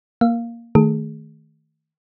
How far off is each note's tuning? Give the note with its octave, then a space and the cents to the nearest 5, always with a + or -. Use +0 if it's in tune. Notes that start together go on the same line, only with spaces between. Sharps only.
A#3 +0 F5 +0
D#3 +0 A3 +0 G#4 +0